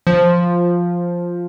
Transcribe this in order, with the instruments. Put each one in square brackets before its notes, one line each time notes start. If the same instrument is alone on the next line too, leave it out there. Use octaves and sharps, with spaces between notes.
[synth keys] F3